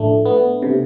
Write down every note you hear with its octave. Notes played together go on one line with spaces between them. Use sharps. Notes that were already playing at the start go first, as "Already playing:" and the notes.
Already playing: A2 F3 A3 D4
B3
C3